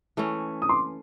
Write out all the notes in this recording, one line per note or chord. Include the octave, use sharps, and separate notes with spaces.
E3 A3 C#4
D#6
C6 D6